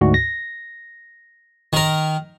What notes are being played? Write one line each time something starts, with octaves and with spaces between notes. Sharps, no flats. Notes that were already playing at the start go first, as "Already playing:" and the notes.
D2 G#2 F#4
A#6
D#3 A#4